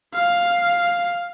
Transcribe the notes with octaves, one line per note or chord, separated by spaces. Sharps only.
F5